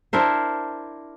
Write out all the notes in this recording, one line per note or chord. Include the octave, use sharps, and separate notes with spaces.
D4 E4 A#4 C5